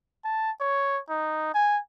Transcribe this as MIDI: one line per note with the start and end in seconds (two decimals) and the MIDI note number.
0.24 0.51 81
0.60 0.99 73
1.09 1.53 63
1.54 1.79 80